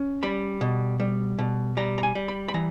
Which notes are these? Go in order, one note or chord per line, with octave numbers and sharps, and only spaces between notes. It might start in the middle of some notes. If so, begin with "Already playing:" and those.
Already playing: C#4
G3 B5
B2
G3
B2
G3 A#5
A#5
G#5
G3
B5
B5
E3 A#5